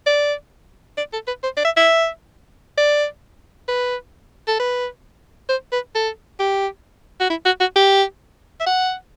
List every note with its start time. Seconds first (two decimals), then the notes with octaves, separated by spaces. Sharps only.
0.07 D5
0.98 D5
1.13 A4
1.27 B4
1.43 C5
1.57 D5
1.65 E5
1.77 E5
2.78 D5
3.69 B4
4.48 A4
4.59 B4
5.49 C5
5.72 B4
5.95 A4
6.40 G4
7.20 F#4
7.30 E4
7.46 F#4
7.60 F#4
7.76 G4
8.60 E5
8.66 F#5